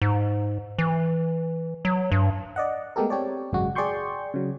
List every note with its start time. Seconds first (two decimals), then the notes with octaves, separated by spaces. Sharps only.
0.02 G#2
0.78 E3
1.85 F#3
2.12 G2
2.56 D5 D#5 F#5
2.96 G#3 A3 B3 G4 A4 A#4
3.10 C4 G4 C#5 D5
3.52 G#1 F#2 C#3 G#3 F#4
3.75 G#4 D5 G5 C6 C#6 G6
4.34 C#3 F#3